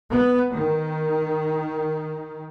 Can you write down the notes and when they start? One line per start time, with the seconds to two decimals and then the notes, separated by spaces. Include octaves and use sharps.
0.12 B3
0.53 D#3